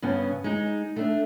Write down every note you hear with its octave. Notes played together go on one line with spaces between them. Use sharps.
G2 C#3 B3 C#4
G#3 D#4
A3 D4